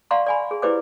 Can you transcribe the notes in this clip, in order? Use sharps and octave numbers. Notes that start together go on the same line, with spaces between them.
D5 F5 F#5 A#5 C6 C#6
D5 G#5 B5
G#4
E4 G4 B4 C5 D5 D6